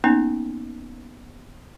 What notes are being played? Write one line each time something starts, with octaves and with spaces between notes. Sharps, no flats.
A#3 B3 C#4 D#4 G#5